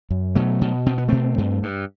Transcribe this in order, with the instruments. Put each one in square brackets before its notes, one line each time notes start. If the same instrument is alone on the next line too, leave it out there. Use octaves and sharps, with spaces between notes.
[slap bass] F#2
B2 F#3 A3
B2
B2 C4
B3
B2 A3 C4
G2
G2